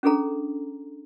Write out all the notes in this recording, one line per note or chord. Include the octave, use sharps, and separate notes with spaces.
C#4 D4 G#4 A4 A#5